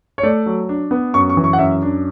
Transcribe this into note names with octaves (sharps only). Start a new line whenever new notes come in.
C#5
A3 D5
F#3
D4
B3
F#2 C#6
C#6
E3
C#6
F#5
F#2 E5
D4